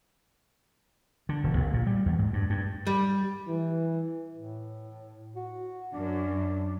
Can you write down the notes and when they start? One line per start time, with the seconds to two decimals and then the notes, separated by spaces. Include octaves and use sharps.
1.29 D3
1.44 E1
1.57 A#1
1.74 A#2
1.87 G3
2.06 E2
2.19 G#2
2.33 G2
2.50 G2
2.87 G3
3.48 E3
4.35 A2
5.36 F#4
5.94 F#2 D4